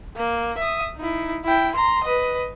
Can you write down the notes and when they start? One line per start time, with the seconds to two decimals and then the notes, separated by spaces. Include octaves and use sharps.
0.16 A#3
0.58 E5 D#6
0.97 D#4 E4
1.45 E4 G5
1.75 A#5 C6
2.04 B4 D#5